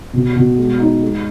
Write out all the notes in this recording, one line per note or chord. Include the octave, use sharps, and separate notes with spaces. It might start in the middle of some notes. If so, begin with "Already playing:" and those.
B2
B2
G#3
D#4
G#3